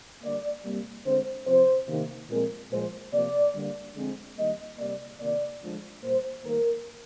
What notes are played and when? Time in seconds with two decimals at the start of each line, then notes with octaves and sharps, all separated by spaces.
0.22 D3 G3 A#3 D5
0.64 C3 G3 A#3
1.05 D3 G#3 C4 C5
1.47 C3 F3 C4 C5
1.88 C3 D#3 A#3
2.29 A#2 F3 G#3 C4 A#4
2.71 A#2 F3 G#3 C5
3.12 C3 F3 A#3 D5
3.54 D3 G3 A#3
3.95 D3 F3 G#3 C4
4.37 D#3 G3 A#3 D#5
4.78 C3 G3 A#3 D5
5.20 C3 D#3 A#3 D5
5.61 D3 F3 G#3
6.03 A#2 G3 A#3 C5
6.44 D#3 G3 A#3 A#4